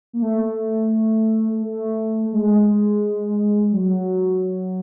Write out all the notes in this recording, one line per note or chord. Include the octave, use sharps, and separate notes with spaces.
A#3
A3
A3
G#3
F#3